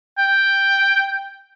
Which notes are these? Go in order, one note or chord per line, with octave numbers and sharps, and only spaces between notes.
G5